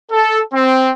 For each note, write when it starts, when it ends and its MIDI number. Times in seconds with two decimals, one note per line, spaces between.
0.12 0.40 69
0.54 0.90 60